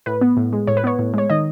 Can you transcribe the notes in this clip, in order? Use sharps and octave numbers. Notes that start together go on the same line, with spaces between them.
A2 B4
B3
A2
G#3
A2 C#5
B4
B3 C#5
A2
G#3 C#5
D#3 D#5